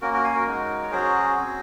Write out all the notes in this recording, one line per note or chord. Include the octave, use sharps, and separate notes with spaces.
A#3 C#4 F#4 A#4
F#4 A#4
F5 G#5
F#4 A#4
G#3 D#4 F#4
C#5
F#3 C#4 F#4 G#4 C5
C4 F#4